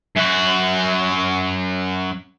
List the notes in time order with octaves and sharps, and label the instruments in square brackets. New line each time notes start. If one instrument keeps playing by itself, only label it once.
[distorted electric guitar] F#2 F#4